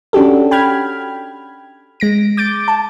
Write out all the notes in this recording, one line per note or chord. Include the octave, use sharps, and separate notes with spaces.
C#4 D4 F#4 G4 A4
G5 B5 F6 G#6
G#3 A#6 D7
D6 G6 A6 D7
A5